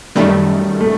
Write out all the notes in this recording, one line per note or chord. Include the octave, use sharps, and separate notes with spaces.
F#2 D#3 G3 A3
A3